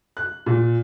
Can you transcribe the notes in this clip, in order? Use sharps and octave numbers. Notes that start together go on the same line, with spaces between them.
F#6
A#2